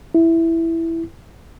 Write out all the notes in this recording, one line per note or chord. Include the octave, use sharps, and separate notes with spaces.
E4